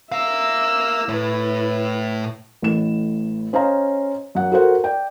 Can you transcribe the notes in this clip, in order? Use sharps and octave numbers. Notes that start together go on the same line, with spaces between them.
A#4 E5 F5 E6
A2 E4 B4
A1 A2 E7
C#4 C5 C#5 D#5 F5 A#5
F#2 F#5
F#4 A4 A#4 C5 F#5
D5 G5